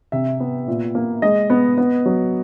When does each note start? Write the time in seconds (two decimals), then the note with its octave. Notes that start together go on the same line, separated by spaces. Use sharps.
0.12 C3 E5
0.40 B3
0.68 A#2
0.95 A#3
1.22 G#3 D#5
1.50 B3
1.78 B3
2.05 F#3